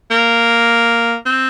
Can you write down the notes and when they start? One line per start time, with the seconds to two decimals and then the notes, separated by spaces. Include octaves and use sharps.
0.11 A#3
1.26 C4